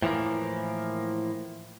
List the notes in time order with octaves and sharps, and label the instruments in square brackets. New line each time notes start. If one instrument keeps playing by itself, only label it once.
[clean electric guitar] A2 E3 F3 A#3